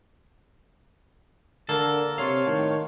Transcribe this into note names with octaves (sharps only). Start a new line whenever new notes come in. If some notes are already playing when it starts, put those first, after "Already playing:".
D3 A#3 A4 A#4
C3 F4 C#5 F5
A2 D#3